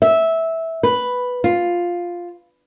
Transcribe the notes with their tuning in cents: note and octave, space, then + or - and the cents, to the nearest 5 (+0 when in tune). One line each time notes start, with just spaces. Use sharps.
E5 -15
B4 +0
F4 +5